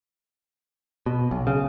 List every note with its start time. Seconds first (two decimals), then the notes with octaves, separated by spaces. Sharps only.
1.06 B2
1.31 B1
1.47 C#3